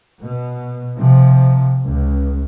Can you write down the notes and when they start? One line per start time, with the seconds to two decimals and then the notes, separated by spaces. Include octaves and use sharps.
0.20 B2
0.97 C3 F3
1.84 C#2